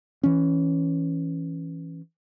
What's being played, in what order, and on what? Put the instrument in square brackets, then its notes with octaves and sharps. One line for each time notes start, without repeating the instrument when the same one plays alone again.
[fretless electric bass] E3 C#4